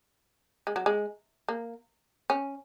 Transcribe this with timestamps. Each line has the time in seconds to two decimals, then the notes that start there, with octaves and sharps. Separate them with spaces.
0.67 G#3
0.76 F#3
0.86 G#3
1.49 A#3
2.30 C#4